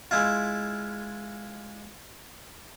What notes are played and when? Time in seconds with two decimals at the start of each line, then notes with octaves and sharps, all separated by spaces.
0.11 G#3 E4 F4